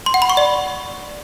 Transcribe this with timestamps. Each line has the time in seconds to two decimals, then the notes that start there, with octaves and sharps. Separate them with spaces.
0.06 C6
0.14 F#5
0.22 B5
0.30 C#6
0.37 D5